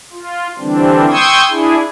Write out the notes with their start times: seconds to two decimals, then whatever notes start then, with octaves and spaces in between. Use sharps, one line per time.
0.12 F4
0.59 D3 E3 G3 C4 D4
1.11 G5 C6 C#6 D#6 E6 G#6
1.50 D4 E4 G#4